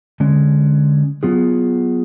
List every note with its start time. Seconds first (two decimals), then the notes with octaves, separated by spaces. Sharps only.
0.20 D3 G#3 C#4
1.23 F#3 B3 F4 G#4